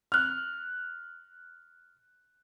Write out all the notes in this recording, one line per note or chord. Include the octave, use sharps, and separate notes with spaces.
F6 F#6